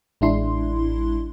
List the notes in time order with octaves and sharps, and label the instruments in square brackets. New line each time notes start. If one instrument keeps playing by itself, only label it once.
[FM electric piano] A1 G#3 D4 E4 C6